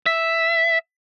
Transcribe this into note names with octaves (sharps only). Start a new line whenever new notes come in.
E5